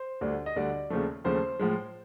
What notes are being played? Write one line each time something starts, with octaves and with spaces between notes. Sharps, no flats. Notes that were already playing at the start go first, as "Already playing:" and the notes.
Already playing: C5
D2 D3 G3
D#5
D2 D3 G3 D5
D#2 C#3 F3 A3
D#2 C#3 F3 A3 C5
A2 F3 G#3